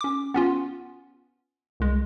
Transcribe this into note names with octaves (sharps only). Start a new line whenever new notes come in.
C#4 D6
B3 C#4 F4
C2 G#3